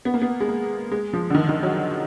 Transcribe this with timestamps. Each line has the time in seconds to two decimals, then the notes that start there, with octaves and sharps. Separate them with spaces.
0.05 B3
0.14 A#3
0.22 B3
0.40 G#3
0.48 A#3
0.92 G#3
1.13 F3
1.30 D3
1.35 D#3
1.49 D#3
1.63 F#3